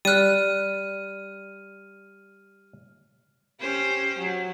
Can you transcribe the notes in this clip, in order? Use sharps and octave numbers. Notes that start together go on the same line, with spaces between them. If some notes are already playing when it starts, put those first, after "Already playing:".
G3 D5 F6 F#6 D#7
C#4 G4 C5
F#3